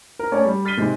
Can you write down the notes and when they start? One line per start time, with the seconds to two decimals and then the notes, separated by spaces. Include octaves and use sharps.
0.19 A#4
0.32 A3 C#4 C#5 D5 A5
0.45 G3
0.65 F6 A6 B6 C7 D#7 G7
0.77 C3 D#3 G#3